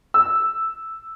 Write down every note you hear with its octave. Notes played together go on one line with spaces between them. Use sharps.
E6